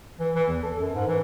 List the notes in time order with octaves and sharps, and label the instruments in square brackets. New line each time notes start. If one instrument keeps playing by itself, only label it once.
[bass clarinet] E3
E3
E2
A4
F#2
G#2
E3